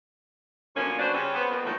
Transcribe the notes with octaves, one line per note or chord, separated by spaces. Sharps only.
B2 D3 F3 F#3 A#3 C#4
F#3 B3 D4 F#4 C5 D5
C#3 G3 C4 C#4
B3 C5
F2 A#3 B3
A#2 D#3 E3 F#3 A3